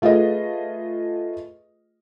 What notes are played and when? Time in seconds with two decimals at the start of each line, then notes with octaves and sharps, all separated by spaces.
0.02 A3 F4 G#4 B4 D#5